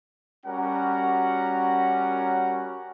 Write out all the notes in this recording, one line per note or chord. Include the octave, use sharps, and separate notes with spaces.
G3 C#4 F#4 A#4 F#5 A#5